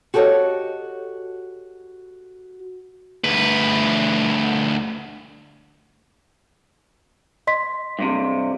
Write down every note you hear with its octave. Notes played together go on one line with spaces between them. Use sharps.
F#4 G4 A4 C5 C#5 D#5
D2 B4
D#5 C6 B6
G2 C3